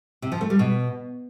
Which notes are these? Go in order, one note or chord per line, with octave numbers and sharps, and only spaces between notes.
C3
F3
A3
G3
B2